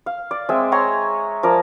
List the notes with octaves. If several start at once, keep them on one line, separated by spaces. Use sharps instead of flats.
F5
D5
G#3 C4 E5 G#5
C#5 G#5 A#5 C6
F3 A#4 D5